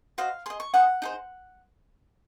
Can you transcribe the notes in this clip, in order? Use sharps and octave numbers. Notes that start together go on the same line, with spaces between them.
F#4 C5 D#5 F5
G#4 D#5 C6
C#6
D#4 G#4 C5 D#5 F#5
D#4 G#4 C5